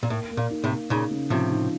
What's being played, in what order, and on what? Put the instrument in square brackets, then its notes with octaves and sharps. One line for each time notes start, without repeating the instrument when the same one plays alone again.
[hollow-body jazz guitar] A#2
[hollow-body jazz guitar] A2 [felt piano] A#3
[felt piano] A#3
[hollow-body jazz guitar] A#2
[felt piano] D#4
[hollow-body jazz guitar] A2 C3
[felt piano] A#3
[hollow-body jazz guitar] A#2 C#3 [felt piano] D#4
[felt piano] C#3
[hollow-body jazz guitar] A2 C3 [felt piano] F3
[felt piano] D#4